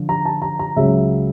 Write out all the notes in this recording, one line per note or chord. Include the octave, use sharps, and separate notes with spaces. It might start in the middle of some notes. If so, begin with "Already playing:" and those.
Already playing: D3 F3
A#5
A5
A#5
A#5
C#2 C#3 F#3 E5